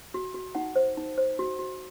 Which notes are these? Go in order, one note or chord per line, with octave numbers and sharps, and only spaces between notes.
F#4
F#4
D#4 F#5
C5
D#4
C5
F#4
F#4